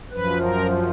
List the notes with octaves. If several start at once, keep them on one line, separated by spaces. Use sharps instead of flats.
F#2 F3 B4
A#4